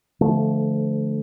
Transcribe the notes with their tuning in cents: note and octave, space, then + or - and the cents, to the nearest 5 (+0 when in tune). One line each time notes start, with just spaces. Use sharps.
D3 +0 F3 -25 A3 -20